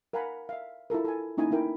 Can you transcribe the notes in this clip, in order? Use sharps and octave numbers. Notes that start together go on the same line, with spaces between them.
A#4 F5 F#5 G#5 A#5 B5
E5 F5
E4 F4 A4 A#4
A4 G#5
A#3 C#4 D#4 E4 G#5
A3 D#4 E4 A#4 G5